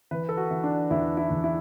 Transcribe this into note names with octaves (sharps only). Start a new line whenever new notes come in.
E3 B4
A4
F#4
E3
D4
E2 E4
E4
E2
E4